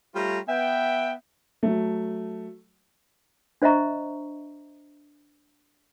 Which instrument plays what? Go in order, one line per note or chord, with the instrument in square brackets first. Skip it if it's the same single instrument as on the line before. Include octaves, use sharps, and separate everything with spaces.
[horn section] G3 A3 F4 G4 C#5 A#5
B3 E5 G5
[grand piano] F#3 A3
[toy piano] D4 C5 D#5 E5 A#5 C#6